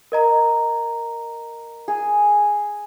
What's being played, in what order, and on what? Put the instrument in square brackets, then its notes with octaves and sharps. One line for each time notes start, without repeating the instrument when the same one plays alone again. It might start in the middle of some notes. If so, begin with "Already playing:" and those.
[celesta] A#4 D#5 A#5
[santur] G#4